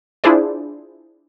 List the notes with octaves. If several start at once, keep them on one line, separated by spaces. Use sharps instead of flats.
D4 E4 F4 G#4 C5 D5